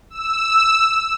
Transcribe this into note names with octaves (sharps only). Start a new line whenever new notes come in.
E6